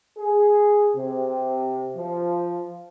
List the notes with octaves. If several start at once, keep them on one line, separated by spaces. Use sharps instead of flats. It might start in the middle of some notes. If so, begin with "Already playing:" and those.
G#4
C3
F3